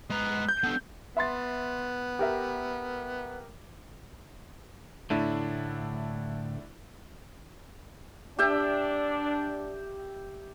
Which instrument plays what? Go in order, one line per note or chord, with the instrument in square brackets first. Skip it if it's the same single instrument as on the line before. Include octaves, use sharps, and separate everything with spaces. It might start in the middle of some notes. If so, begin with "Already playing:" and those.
[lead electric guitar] G#3 A#5 [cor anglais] B3
[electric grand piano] G6
[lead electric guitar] B3 D4 [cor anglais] A4
[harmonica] B3 [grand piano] E5 C6 A6
[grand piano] G4 A#4 E5
[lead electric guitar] A2 D3 [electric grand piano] A3 D4 E4
[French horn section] D4 [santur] G4 E5 G5